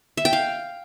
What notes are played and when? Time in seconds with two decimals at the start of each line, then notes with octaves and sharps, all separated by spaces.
0.17 E5
0.25 G5
0.33 F5